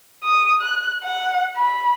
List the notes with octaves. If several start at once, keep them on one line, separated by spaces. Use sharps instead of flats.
D#6
F#6
F#5
B5